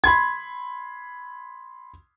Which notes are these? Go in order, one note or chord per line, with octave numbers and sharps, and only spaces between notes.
B5 C6 G#6